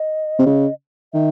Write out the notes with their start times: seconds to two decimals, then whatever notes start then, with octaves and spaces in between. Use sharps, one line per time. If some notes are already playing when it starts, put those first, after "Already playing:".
Already playing: D#5
0.39 C3
0.46 C#3
1.13 D#3 E5